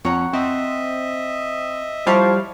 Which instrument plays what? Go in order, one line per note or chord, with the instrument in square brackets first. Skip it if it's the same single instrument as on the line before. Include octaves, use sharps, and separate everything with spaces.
[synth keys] F2 [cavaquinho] C#5 F#5 A#5
[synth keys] C4 [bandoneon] D#5 E5
[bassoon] F3 [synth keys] G3 F5 [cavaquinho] E4 C#5